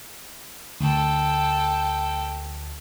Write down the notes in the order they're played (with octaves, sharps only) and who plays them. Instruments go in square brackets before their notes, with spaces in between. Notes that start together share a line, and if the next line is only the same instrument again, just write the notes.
[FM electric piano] D2 [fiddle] A4 G5